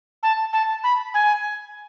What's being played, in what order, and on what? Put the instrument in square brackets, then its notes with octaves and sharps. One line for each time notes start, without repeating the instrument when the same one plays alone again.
[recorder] A5
A5
B5
G#5